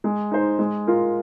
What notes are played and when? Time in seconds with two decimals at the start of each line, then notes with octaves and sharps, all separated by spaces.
0.04 G#3
0.31 D#4 C5
0.59 G#3
0.87 F4 A#4